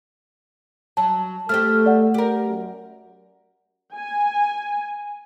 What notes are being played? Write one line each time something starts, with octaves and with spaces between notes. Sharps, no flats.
F#3 A5
A3 C4 G4 A4 F6
D5 F#5
G4 A#4
F#2
G#5